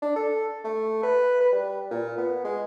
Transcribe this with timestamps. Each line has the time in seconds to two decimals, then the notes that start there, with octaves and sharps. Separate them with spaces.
0.02 D4
0.16 A4
0.64 A3
1.03 B4
1.41 B4
1.52 G3
1.91 A#2
2.18 B3
2.45 G#3